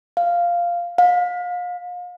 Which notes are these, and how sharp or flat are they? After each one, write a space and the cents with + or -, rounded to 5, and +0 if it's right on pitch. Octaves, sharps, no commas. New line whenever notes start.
F5 -5
F5 +35